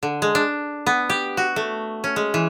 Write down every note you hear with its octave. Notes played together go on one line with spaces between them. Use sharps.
D3
G#3
D4
B3
G4
F#4
A3
C#4
G#3
E3